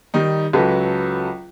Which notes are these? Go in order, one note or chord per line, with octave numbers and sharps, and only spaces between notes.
D#3 G3 D#4
C#2 F#3 A4 B4